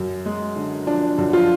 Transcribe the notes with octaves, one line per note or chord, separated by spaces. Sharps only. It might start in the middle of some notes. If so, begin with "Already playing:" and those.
Already playing: F#2
G#3
D3
F3 D4
F#2
F3 F4